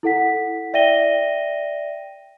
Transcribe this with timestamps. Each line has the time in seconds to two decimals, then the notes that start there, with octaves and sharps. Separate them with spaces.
0.03 E4 A4 F#5 B6
0.73 D5 E5 G5 A#6 D#7 G7